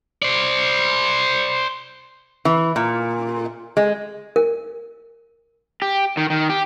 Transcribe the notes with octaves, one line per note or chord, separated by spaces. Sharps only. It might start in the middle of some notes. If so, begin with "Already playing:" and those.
C5 D5
E3
A#2
G#3
A#4
G4
D#3
D#3
G4